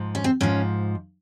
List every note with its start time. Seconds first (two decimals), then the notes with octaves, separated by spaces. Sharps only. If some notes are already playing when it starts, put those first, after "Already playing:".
Already playing: G#2 F3
0.15 C#4
0.24 C4
0.41 G#2 F3 C#4